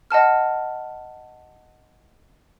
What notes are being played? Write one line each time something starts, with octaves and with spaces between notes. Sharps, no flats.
D#5 F#5 A5 F6